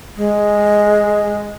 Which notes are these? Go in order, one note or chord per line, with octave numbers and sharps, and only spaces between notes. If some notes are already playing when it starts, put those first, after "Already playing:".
G#3